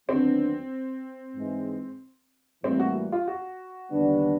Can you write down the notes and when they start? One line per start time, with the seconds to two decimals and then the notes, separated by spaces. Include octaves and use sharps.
0.09 D#2 D3 F#3 B3 C4 D4
1.36 G#2 E3 G#3
2.64 A2 E3 G3 A#3 C4
2.80 F#4
3.12 F4
3.28 F#4
3.92 D#2 D3 G3 B3 D4